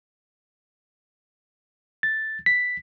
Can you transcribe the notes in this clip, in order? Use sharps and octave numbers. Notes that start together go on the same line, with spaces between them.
A6
B6